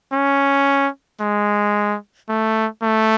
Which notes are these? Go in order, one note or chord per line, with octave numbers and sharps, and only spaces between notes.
C#4
G#3
A3
A3